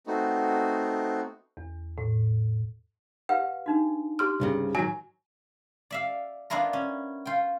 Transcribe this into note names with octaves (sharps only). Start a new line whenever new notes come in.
A3 B3 C4 D#4 F#4
E2
A2
G4 B4 F5 F#5
D4 D#4 F#4
G4 C6 F6
C2 G2 C#3
G#2 D#3 F#3 G#5
D5 E5 F5
B3 D4 E4 F4 A#4
C#4
F4 G5